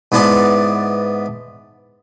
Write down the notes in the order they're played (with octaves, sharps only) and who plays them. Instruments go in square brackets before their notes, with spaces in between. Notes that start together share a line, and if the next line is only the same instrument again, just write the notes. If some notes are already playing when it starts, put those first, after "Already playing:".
[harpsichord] G#2 B3 E4 D5 A5